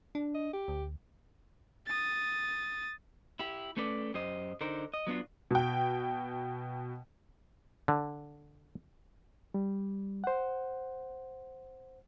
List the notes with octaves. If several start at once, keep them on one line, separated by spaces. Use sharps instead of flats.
D4
D#5
G4
D2
D#6 A6
E4 G4
A3 C#4 A4 B4 D5
F#2 G4 C5 D#5
D3 D#4 A#4 C5
D#5
F#3 B3 D4 F4
B2 G5
D3
G3
C5 F#5